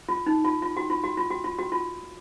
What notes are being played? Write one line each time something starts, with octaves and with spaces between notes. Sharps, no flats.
F4
D#4
F4
F4
F#4
F4
F#4
F4
F#4
F4
F#4
F4